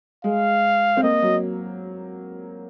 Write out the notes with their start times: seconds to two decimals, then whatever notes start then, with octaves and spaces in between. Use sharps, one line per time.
0.24 G#3 F5
0.97 C4
1.03 A#3 D#5
1.22 F#3